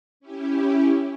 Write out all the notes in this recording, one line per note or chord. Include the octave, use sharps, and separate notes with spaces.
C#4 E4 G4